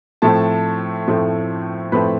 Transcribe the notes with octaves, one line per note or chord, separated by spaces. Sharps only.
A2 F3 A3 C4 A4 A5
A2 F3 A3 C4
A2 F3 A3 C4 B4 B5